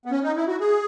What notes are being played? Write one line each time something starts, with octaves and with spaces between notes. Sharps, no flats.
B3
C#4
D#4
E4
F#4
G#4